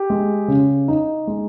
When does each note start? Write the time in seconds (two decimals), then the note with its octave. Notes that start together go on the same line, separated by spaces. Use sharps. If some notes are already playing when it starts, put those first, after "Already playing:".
Already playing: G4
0.10 G#3
0.48 C#3
0.88 D#4
1.27 G#3